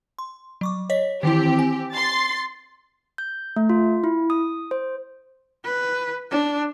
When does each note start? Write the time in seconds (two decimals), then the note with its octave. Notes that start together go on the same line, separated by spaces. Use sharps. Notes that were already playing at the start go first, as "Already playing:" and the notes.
0.19 C6
0.61 F#3 C#6 D6
0.90 C#5 D#5 B6
1.23 D#3 E3 C4 E4 G4
1.59 G#5
1.95 C6 A6
3.18 G6
3.56 A3
3.69 F4
4.04 E4
4.30 D#6
4.71 C5
5.65 B4
6.31 D4